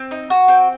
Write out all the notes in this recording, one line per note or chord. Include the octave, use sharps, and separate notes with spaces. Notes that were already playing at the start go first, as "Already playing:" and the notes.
Already playing: C4
D#4
F#4
C4 G5